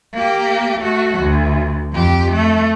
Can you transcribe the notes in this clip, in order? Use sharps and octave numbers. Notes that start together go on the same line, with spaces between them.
A#3 G4
A3 F#4
D2
F2 G4
A3